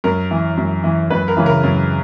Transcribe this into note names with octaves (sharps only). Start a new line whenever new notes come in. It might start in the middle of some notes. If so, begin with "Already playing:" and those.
F#2 A#4
E3
F#2
E3
F#2 B4
A#4
C#3 E3
A#4
F#2